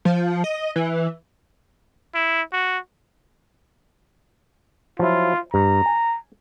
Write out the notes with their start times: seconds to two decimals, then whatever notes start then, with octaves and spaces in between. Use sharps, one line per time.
0.05 F3
0.44 D#5
0.76 E3
2.15 E4
2.53 F#4
4.99 F3 F#3 E4 F4
5.54 G2 A#5
5.86 G#5